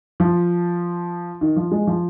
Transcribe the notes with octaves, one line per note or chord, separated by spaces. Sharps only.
F3
D#3
F3
G#3
F3